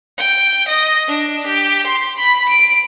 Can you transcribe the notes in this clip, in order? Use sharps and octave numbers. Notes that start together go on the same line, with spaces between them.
G5
D#5
D4
G4
C6
B5
D7